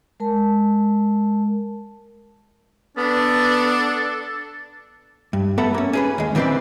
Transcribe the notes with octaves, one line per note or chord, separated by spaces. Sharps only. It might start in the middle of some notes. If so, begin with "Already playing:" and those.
G#3 A#4 A5
B3 D4 A4
G2
A3 B3 A4 B4 F#5 A#5
A#3 C#4
C#4 G#4 B4
D#2 G#3
D2 E3 C4 B4 C5 D5